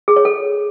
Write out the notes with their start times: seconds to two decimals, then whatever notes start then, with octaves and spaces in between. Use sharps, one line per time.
0.08 G#4
0.16 C#5
0.25 A4